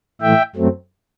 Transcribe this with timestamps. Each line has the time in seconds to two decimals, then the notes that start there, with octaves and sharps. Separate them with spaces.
0.21 A2 E3 A3 E5 G5
0.55 F#2 F#3 A3 C4